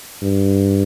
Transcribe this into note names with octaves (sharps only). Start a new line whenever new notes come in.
G2